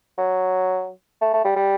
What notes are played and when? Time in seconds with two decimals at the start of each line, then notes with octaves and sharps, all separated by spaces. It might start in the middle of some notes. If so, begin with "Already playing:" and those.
0.18 F#3
1.21 A3
1.33 A3
1.44 G3
1.56 G3